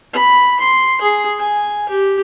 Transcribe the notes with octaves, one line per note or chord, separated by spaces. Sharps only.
B5
C6
G#4
G#5
G4